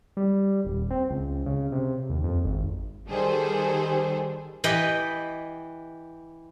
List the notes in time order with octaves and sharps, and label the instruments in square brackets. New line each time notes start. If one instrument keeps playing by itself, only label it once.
[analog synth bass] G3
D#1
C4
C#2
C#3
C3
D#2
F2
G#1
[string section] D#3 G3 G#4 A4 C5
[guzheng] E3 G4 B4 D#5 G5 B5